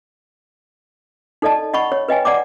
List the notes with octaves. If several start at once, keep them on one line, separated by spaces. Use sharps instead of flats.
D#4 A4 D5 D#5 A5
D#5 F#5 B5 C#6
C#5
B4 D#5 G5 G#5
D5 F#5 A#5 D6